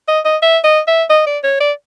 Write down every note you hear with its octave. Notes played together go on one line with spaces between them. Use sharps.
D#5
D#5
E5
D#5
E5
D#5
D5
C#5
D5